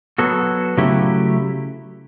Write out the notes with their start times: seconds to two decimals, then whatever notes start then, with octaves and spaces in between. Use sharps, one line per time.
0.18 F#3 B3 F#4 A4
0.77 C#3 F#3 A3 E4 G4